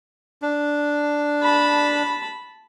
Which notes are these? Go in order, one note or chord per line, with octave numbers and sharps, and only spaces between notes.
D4
A5 B5